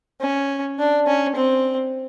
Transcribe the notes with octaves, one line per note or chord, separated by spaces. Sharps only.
C#4
D4
C#4
C4